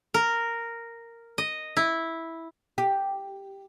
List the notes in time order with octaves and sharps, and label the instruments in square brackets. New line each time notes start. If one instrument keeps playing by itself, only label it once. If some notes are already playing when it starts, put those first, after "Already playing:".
[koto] A#4
D#5
E4
[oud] G4